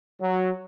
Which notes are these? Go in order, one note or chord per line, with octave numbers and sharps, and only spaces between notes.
F#3